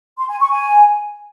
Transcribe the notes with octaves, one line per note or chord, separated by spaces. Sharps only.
C6
G#5
C#6
G#5